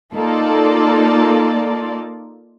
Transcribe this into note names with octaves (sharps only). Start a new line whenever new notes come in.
A#3 D#4 F4 A4 D5